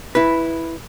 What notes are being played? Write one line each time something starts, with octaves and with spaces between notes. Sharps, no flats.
E4 B4